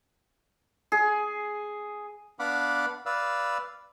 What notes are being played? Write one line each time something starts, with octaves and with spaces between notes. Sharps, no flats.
G#4
B3 D4 F5 F#5 B5 D6
B4 D5 F5 E6